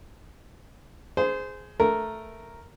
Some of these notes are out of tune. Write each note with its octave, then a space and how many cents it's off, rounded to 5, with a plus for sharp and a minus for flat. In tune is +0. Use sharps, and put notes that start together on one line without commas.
G#4 +10 C5 -20
A3 +0 A#4 +0